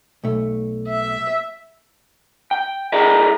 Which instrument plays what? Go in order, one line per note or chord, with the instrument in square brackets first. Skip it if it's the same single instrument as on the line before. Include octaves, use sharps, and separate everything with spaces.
[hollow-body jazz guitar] B1 A3
[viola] E5
[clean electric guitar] G5
E4 G4 G#4 A#4 D5 D#5